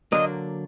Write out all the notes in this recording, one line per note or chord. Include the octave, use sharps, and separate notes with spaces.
D3 F#3 A#3 D4 D#5